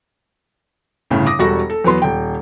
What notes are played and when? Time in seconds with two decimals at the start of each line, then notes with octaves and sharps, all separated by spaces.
1.10 G1 A2 C#3
1.26 D6 D#6 A#6
1.39 E1 G3 F#4 A4 C#6 A#6
1.70 A4
1.84 E2 F#3 B3 C6
2.02 D#1 G5